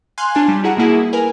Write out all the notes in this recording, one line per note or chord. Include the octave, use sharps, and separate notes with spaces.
F5 G#5 C6 F#6
D4 F4 C#5 G#5 A5
G3
E4 F#4 G#4 F#5 A#5
B2 A#3 E4 G#4
A#4 B4 G#5